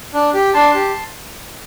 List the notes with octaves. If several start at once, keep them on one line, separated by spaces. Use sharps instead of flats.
D4
G4
D4 A5 C6
G4